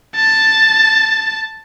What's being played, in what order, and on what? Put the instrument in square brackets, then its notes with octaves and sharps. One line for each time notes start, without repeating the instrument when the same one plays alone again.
[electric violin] A5